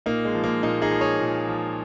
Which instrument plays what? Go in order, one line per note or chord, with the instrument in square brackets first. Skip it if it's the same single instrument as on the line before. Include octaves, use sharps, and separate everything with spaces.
[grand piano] A#2 A#3 D#4
G#3
F3
A#3
A#2 A#3 D#4
D#4 G#4
F3
G#4 C#5
A#2
F3